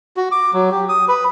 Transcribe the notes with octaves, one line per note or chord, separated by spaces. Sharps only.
F#4
D6
F#3
G4
D#6
B4